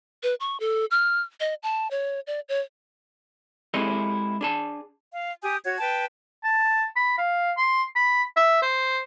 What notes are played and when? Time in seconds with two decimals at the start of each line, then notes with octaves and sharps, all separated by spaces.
0.23 B4
0.40 C#6
0.60 A4
0.91 F6
1.40 D#5
1.63 A5
1.91 C#5
2.27 D5
2.49 C#5
3.74 G#3 C4 E4 G4 A4 D#5
4.41 D4 G#4 A5
5.12 F5
5.43 G4 G#5 D#6 G6
5.65 F#4 C#5 G#6
5.80 B4 G5 A5
6.44 A5
6.96 B5
7.18 F5
7.57 C6
7.96 B5
8.36 E5
8.62 C5